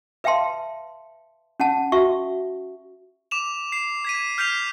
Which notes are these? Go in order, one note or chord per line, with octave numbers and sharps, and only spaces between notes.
B4 E5 F5 G5 A5 C6
C#4 F#5 A5
F#4 E5 C#6
D6 E7 F7
C7
G#6 B6 D#7
F6 G6 B6 C7 F7